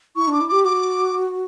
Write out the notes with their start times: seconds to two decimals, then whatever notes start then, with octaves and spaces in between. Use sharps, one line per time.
0.16 E4 C#6
0.28 D4 D6
0.41 E4
0.49 G4 D6
0.65 F#4 D6